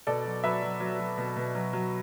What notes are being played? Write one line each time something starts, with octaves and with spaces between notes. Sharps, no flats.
B2 A4 D5
F#3
F#3 B4 E5
F#3
F#3
F#3
B2
B2
F#3
F#3